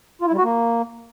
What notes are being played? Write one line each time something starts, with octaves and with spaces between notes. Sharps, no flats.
F4
E4
G3
F#4
A#3